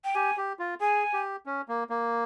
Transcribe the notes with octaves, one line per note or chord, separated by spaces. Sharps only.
G5
G4 G#5
G4
F4
G#4 G#5
G4
C#4
A#3
A#3